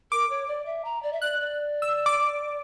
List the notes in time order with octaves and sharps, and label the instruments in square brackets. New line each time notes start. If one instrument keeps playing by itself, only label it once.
[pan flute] A#4 [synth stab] D6
[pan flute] C#5
D5
E5
A#5
D5
E5
[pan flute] D5 [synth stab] F#6
[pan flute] D5
[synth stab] E6
D6